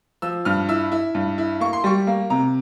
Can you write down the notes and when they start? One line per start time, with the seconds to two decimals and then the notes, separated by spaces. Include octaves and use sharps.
0.22 F3 E6
0.45 G2 F6
0.69 E4 E6
0.92 E4
1.15 G2
1.38 E4
1.60 A#3 C#6
1.73 C6
1.84 G3 C#6
2.07 A#3
2.30 C3 A#5